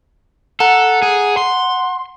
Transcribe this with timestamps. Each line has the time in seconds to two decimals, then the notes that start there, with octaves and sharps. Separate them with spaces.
0.60 A4 F#5 A#5 F#6
1.02 G#4
1.37 C6